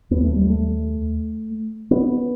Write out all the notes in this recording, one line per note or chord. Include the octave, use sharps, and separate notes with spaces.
D#2 B3
A3
G3
A3
B3